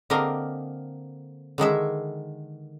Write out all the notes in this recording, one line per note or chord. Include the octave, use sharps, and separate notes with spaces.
D3 A#3 C4 A#4 D#5
D3 D#3 G#3 E5